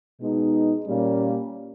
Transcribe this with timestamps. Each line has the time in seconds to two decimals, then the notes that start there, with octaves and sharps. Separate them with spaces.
0.20 B2 G#3 D#4
0.85 A#2 G3 A#3 C#4